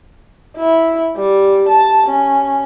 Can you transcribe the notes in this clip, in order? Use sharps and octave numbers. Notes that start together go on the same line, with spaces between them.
E4
G3
A5
C#4